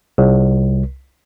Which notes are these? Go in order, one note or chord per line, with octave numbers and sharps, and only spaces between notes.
C2